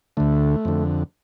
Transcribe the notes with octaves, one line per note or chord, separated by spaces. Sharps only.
D2 D3 A3
F2 D3